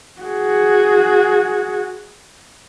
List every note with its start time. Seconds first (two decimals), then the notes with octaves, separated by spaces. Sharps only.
0.21 F#4 G#4